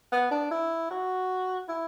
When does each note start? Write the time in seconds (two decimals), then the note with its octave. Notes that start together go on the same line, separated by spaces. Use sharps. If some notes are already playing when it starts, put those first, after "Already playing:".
0.12 B3
0.31 D4
0.51 E4
0.91 F#4
1.69 E4